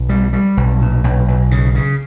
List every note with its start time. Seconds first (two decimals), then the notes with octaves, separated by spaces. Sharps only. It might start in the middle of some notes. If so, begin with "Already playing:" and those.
Already playing: B1
0.09 G3
0.33 G3
0.57 B1
0.81 A#2
1.04 B1
1.28 B1
1.51 C#3
1.75 C#3